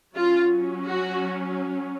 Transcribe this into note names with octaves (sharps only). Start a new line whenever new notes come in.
F#3 C#4 F4
F#4